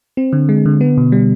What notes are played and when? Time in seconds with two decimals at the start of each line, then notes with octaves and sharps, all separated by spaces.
0.17 C4
0.33 D3
0.49 G#3
0.66 D3
0.81 B3
0.97 B2
1.12 G3